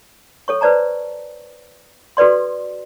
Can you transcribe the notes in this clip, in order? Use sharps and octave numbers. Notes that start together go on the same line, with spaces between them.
A4 C#5 C#6
B4 C5 D5 A5 A#5
F#4 A4 B4 D5 C6